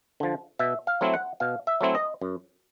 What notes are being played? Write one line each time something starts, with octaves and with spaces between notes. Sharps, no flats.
D3 F3
B2 E5
F5
F#3 A3 C4 E4
F#5
B2 F5
E5
F#3 A3 C4 E4
D#5
F#2